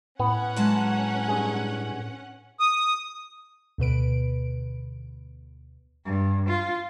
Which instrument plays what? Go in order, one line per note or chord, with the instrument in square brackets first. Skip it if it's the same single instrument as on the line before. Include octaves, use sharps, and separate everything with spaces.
[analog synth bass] A2 [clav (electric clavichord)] B3 [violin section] C#4 F#5
[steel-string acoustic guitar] F#3 G#3 A5
[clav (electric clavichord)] G2 G#4
[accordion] D#6
[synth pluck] D2 B2 B4 D7
[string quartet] G2
F4